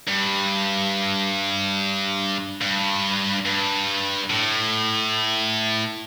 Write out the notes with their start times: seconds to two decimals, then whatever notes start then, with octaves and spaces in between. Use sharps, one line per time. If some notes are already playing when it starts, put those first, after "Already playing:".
0.07 G2
2.62 G2
3.46 G2
4.30 A2